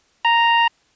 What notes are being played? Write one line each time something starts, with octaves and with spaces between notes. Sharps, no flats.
A#5